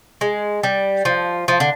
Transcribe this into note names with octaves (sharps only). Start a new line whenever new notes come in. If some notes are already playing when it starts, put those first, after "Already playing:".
G#3
G3
F3
F3
D3